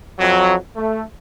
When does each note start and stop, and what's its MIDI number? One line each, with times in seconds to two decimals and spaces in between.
0.20 0.54 41
0.20 0.54 54
0.77 1.03 57